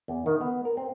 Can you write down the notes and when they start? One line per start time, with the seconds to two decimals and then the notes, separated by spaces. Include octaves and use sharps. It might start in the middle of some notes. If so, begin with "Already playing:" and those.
0.08 E2
0.26 D#3
0.41 B3
0.65 A#4
0.77 C4